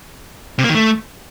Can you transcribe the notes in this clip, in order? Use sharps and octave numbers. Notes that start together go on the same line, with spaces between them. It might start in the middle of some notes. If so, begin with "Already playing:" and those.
C3
A#3
D#3
A3